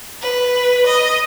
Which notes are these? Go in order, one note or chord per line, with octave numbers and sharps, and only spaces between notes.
B4
D#5